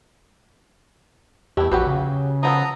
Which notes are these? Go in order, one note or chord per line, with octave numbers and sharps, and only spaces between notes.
E2 A3 E4 G4
A#1 F#3 F#4 G4 B4
C#3
F3 B3 A4 A#5 D#6